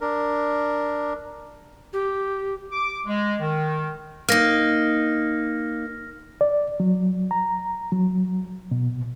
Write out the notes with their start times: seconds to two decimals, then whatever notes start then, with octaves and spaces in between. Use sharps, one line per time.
0.01 D4 A#4
1.93 G4
2.72 D6
3.06 G#3
3.40 D#3
4.29 A#3 D#4 F6 A#6
6.41 D5
6.80 F#3
7.31 A#5
7.92 F#3
8.71 B2